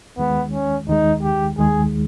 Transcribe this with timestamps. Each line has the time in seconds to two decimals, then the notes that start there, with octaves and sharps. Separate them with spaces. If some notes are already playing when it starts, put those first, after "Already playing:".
0.17 D#2 D#3 G#3 B3
0.52 C#4
0.87 D#2 D#3 G#3 D#4
1.23 G4
1.58 D#2 D#3 G#3 G#4